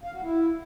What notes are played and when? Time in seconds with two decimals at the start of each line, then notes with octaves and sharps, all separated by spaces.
0.03 F5
0.13 F#4
0.23 E4